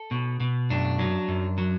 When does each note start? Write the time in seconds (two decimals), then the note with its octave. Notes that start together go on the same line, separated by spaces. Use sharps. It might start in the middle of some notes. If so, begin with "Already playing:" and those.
Already playing: A4
0.11 B2
0.40 B2
0.70 F#2 D4
0.99 F#3
1.28 F#2
1.58 F#3